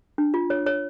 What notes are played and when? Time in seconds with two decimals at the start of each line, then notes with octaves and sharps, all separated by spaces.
0.18 D4
0.34 F4
0.50 C#5
0.66 C#5